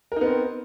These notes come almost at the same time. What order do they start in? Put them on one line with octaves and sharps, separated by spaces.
A#4 D#4 B3 C4